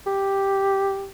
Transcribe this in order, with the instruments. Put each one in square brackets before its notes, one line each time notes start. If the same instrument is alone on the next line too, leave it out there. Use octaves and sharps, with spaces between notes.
[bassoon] G4